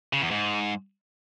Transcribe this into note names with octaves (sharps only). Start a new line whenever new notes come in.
C#3
E2
G#2